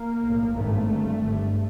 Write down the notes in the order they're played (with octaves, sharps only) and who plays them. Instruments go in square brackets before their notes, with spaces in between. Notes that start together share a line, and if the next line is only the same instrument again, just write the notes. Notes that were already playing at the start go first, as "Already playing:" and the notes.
Already playing: [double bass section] A#3
B1 A2
G#1 G2 A3
G1 G2
G1 G2